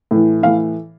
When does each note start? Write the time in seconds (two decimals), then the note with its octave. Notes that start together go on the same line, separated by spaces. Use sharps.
0.11 A2 E3
0.43 A2 E3 F5